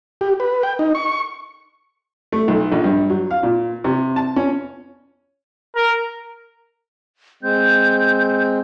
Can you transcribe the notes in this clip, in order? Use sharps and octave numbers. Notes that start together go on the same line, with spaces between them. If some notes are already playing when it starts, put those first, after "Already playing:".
G4
B4
G5
D#4
C#6
A3
B1
A#1
G2
F#3
F5
A#2
C3
A5
C#4
A#4
G#3 C4 G6